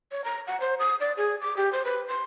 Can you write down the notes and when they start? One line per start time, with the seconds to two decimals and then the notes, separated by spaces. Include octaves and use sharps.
0.12 C#5
0.24 A#5
0.47 F#5
0.60 C5
0.80 D#6
1.00 D5
1.17 G#4
1.41 D6
1.57 G4
1.73 C5
1.85 B4
2.08 C6